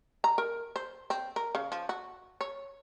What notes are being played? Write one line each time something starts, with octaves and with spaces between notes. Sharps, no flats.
A#5
A#4
C5
C4
A#4
C#3
F3
F#4
C#5